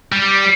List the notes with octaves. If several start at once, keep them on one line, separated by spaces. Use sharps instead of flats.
G3